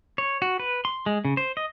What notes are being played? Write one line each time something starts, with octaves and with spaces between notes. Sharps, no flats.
C#5
F#4
B4
C6
G#3
C#3
C5
D#5